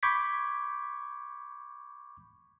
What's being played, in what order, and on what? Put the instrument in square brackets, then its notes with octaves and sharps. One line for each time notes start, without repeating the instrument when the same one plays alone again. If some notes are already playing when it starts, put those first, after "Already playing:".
[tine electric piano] B5 C#6 D6 G6 G#6 B6